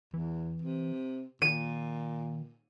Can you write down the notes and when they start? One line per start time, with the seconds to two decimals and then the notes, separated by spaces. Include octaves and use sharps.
0.14 E2 E3
0.62 C3
1.42 A#2 D#3 D#7